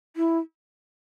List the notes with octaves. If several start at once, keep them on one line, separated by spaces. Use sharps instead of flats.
E4